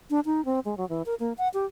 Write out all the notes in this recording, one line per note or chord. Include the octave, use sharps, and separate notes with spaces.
D4
D#4
C4
G#3
F#3
E3
A#4
A#3
F#5
G4